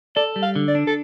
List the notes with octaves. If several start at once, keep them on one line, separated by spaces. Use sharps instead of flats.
A4 D5
G3
F5
D3
D5
D4
A4